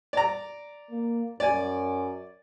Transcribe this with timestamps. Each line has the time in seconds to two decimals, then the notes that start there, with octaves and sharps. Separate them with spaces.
0.13 D5 A#5
0.91 A#3
1.40 F#2 D5 G#5